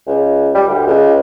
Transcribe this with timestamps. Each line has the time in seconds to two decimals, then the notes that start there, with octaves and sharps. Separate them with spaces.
0.07 C#2
0.54 G3
0.68 D2
0.87 C#2